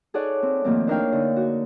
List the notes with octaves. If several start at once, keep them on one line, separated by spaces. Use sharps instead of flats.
D#4 G#4 A4 C#5 D5 F#5
C4
D#3 F3 A3 A#3 C4
D4 D#4 A#4 C#5 F5 G5
D3 D#4
F#4